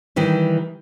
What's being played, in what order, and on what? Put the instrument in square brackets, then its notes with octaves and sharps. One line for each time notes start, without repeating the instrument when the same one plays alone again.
[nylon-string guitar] D#3 E3 G3